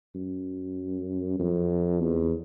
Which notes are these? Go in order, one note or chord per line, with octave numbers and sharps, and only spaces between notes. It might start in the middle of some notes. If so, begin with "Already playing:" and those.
F#2
F2
E2